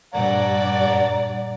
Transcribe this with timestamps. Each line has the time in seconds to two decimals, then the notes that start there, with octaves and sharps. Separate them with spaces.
0.14 G2 A#2 A#3 D5 F#5 A#5